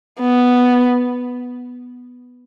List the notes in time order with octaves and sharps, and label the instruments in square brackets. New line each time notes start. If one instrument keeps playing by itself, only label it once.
[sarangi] B3